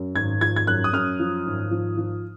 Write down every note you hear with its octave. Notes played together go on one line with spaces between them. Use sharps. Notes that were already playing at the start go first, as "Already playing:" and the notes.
Already playing: F#2
G#1 G#6
F3 G#6
G#6
F#2 F#6
D#6
F#2 F6
F3
G#1
F3
F3